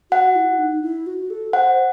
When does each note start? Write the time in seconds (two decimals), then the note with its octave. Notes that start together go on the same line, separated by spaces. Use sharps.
0.11 F#4 F#5
0.36 E4
0.59 D#4
0.82 E4
1.07 F#4
1.30 A4
1.53 C5 F#5